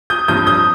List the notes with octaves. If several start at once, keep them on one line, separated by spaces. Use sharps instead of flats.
D#6 G6
G2 F3 C4 D#6 G6
D#6 G6